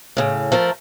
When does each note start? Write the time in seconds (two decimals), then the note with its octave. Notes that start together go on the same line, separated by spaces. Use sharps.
0.17 A2 C#3
0.52 F3 A3 A#4